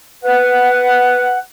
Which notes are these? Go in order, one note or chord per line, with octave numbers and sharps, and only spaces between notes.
B4 F#5